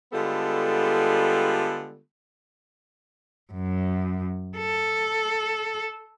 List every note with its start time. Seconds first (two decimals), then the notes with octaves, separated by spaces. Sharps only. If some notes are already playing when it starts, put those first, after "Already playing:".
0.13 D3 G3 G#3 B3 F4 A4
3.53 F#2
4.58 A4